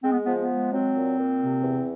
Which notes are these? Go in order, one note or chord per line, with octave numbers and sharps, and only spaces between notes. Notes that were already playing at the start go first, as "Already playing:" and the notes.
G#3 C4
B3
F3 B3
B3
G#3
F#3 C4
A#2
A#2
C3
E2